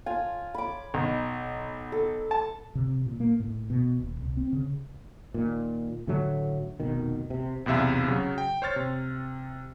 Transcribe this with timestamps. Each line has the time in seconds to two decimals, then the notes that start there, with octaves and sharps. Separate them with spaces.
0.06 F4 G#5 A5
0.54 B5 D6
0.94 B1
1.92 A4
2.31 A5
2.75 C3
3.06 A#2
3.20 A#3
3.40 A2
3.70 B2
3.99 D#1
4.21 C2
4.37 C4
4.53 C#3
5.34 A#2 D#3
6.07 A2 D3 F#3 A3
6.80 F1 B2 D#3
7.30 C3
7.66 B1 E2 C3 E5 F5
8.08 C#3 F#3
8.38 G5
8.62 C5 C#5 F6 A6
8.76 C3